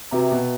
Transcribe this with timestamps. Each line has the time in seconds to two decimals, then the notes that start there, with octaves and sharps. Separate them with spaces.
0.11 C3 F#4 B4 E5 G5 A#5
0.32 B2